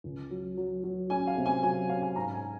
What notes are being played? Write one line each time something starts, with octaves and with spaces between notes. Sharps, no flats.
C#2
F#3
F#3
F#3
C#4 G#5
F5
C3
G#5
F#3 G#5
C#4 F5
G#5
G#2 A#5
G#5